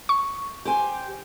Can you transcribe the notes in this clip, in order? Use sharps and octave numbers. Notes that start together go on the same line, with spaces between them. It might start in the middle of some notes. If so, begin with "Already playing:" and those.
C#6
G4 C5 G#5